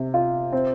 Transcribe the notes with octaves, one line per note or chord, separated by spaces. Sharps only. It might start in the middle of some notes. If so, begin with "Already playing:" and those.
Already playing: C3
F4
C4